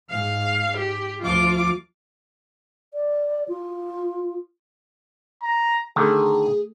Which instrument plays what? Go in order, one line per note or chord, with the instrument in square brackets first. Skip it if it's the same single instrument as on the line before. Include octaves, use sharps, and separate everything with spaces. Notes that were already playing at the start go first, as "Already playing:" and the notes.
[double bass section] G#2 [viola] F5
[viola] G4
[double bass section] D2 F3 [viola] F4 D6
[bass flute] D5
F4
[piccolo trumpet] A#5
[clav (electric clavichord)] D3 D#3 [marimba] A3 A4 [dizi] G#4